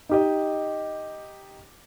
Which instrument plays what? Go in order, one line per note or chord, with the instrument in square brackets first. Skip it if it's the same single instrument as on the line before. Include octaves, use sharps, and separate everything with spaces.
[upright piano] D#4 G4 D#5